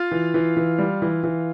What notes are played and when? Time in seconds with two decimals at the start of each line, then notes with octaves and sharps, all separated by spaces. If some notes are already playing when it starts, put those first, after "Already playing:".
Already playing: F4 F5
0.11 E3
0.34 E3
0.57 E3
0.78 G3
1.02 E3
1.23 E3